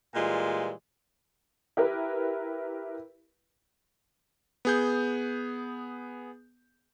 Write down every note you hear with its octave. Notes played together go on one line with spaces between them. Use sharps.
A#2 E3 G3 G#3 F4
E4 G4 A#4 B4
B3 G#4 G6